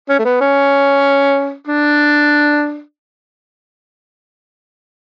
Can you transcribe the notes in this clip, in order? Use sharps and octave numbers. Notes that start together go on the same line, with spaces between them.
C#4
A3
B3
C#4
D4